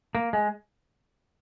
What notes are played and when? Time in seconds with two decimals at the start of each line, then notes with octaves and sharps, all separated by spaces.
0.15 A#3
0.33 G#3